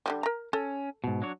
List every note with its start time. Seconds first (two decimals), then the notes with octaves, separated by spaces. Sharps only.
0.06 D3 F#3 G3
0.23 A#4 A#5
0.53 C#4 A4
1.04 G#2 B2
1.22 F#3 D4 C#5